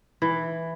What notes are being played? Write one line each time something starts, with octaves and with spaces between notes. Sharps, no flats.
E3